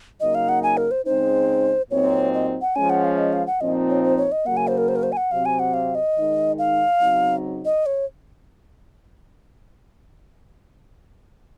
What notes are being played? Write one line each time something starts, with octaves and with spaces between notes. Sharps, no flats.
C#3 F#3 A#3 D#4 D#5
F5
F#5
G#5
A#4
C5
C#3 G#3 C4 D#4 C5
A#2 F#3 C4 D#4 C#5
D#5
F#5
F3 G#3 C#4 G#5
F#5
F5
D#5
F5
F#5
A#2 F3 C4 D#4 D#5
C#5
C5
C#5
D#5
C#3 F#3 A#3 F#5
G#5
C5
A#4
C5
A#4
C5
G#5
F#5
C3 F#3 C4 F5
G#5
F#5
F5
D#5
D#3 G#3 D#4
F5
C#3 F#3 C4 D#4
D#5
C#5